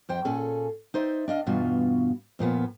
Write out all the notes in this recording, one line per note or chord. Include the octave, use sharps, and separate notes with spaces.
F2 C5 G5
A#2 C#4 G#4 A4
D#4 C5 D5 E5
D4 D#5 F5
E2 G2 B2 F4 F#4
F2 A#2 F3 B3